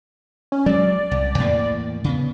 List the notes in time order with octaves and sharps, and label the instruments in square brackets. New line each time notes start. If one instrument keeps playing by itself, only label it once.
[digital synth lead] C#4
[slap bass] F#3 G#3 [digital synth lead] D5
[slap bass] C2
E2 A2 A#3
C#3 B3